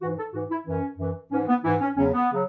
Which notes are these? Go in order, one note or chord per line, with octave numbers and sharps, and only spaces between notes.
G#2 E3 F#4
A4
G#2 E3 F#4
E4
F#2 E3 C#4
F#2 E3
G#2 E3 C#4
B3
G#2 E3 E4
C#4
E2 C#3 F#3 C#4
B3
C#3 F#3